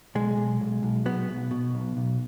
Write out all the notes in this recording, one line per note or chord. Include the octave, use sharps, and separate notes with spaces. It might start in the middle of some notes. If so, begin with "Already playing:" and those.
B1 G#3
B1
B1
B1
F#3 B3
B1
B2
B1
B1